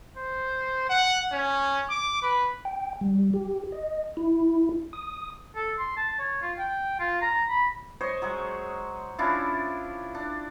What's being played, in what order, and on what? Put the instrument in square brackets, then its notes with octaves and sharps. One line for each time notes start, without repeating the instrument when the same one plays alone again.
[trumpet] C5
F#5
C#4
D6
B4
[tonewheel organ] G5
G3
G4
D#5
E4
D#6
[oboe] A4
C6
A5
C#5
F4
G5
F4
A#5
B5
[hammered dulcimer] C5 C#5 D#5
F#3 G#3 G#4
C#4 D4 E4 F4
D4